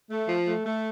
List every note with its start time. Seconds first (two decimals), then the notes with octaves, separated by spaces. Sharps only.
0.10 A3
0.28 F3
0.47 A3
0.66 A3